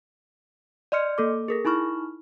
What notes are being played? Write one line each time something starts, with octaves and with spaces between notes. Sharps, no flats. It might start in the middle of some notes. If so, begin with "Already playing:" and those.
D5 D#5 C6 F6 C#7
A#3 A4 D6
G#4 A#4 A#6
D#4 E4 B5 C#6 F6